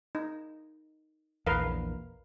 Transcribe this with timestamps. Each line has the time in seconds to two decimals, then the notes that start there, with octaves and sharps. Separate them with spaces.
0.15 D#4
1.46 A#1 E2 A#4 B4 F5